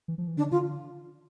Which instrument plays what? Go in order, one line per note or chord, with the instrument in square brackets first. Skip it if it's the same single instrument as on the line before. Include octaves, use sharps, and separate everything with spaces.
[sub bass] E3
F3
E3
[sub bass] D3 [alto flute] D4
[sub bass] D3 [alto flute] F4